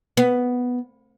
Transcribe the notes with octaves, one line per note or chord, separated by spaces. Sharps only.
B3